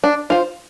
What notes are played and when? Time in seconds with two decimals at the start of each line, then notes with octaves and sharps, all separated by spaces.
0.04 D4
0.30 F4 C5